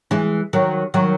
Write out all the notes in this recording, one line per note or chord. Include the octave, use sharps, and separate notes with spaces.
E3 G#3
D#3 F#3
D#3 F#3